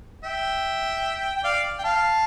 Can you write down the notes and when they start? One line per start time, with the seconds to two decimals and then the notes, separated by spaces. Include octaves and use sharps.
0.24 E5 G5
1.36 G5
1.44 D5 F5
1.79 G5
1.84 F5 A5